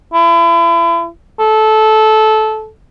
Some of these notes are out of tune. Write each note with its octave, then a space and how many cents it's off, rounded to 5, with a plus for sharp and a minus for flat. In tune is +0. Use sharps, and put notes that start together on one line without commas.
E4 +35
A4 -20